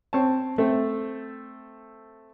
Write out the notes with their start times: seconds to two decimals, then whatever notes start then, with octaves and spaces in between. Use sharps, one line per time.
0.13 C4 C#5 A5
0.58 A3 C4 A4